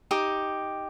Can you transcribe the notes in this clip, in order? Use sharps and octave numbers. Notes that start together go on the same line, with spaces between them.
D#4 G4 D6